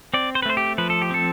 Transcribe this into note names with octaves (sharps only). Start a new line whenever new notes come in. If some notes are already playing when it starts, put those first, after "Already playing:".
C4 D5
C5
B4
A3 C5
G4
F3 B4
A4
G4
C4 A4